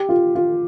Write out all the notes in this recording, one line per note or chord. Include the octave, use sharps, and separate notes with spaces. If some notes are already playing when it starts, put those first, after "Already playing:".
Already playing: G4
F4
F4